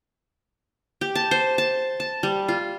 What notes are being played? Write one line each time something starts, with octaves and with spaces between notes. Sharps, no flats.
G4
A5
C5
A5
A5
G3
F4